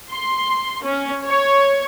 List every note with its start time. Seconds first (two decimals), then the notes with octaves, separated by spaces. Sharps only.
0.11 C6
0.85 C#4
1.24 C#5